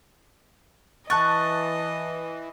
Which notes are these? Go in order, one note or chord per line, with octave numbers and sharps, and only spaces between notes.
E3 D#5 A5 C#6 F#6 A6